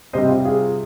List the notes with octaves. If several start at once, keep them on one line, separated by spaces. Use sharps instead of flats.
C3 G3 C4 C5 D#5
F4
F4 G#4